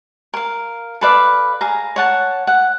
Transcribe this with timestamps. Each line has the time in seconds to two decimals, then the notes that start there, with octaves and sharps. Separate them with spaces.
0.34 A#4 F5
1.01 A4 B4 D5 F5
1.61 G#4 F5 A#5
1.96 C#5 F#5 A5
2.47 F#5